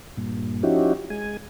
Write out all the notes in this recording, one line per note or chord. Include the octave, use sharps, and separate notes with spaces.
G2 A#2
F3 C#4 D#4 E4 F#4 G4
G#3 G#5